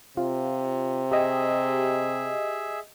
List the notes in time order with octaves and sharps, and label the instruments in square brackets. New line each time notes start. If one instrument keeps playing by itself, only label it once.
[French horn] C3 [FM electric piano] F4
[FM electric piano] G4 D#5 [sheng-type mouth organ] G#4 E5